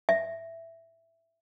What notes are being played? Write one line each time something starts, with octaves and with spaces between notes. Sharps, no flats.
E5